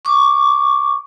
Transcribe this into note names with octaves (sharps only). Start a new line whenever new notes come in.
C#6 D6